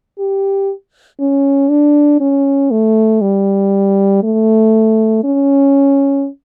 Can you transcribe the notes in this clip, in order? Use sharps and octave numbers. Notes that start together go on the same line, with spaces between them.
G4
C#4
D4
C#4
A3
G3
A3
C#4